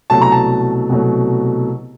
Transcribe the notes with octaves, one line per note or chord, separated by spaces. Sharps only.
C2 B2 F#3 A3 A5
A#5
A5
C2 B2 F#3 A3